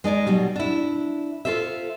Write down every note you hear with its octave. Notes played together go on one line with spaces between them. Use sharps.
G#3 D#4 D5 G#5
B2 F#3 G3
D4 E4
F4 F#4 A4 C5 E5